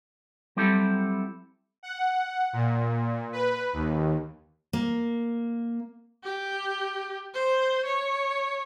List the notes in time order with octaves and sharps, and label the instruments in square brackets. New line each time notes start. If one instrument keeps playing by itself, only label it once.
[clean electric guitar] F#3 G3 C4 E4 G4 A4
[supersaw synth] F#5
A#2
B4
D#2
[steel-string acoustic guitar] A#3
[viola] G4
C5
C#5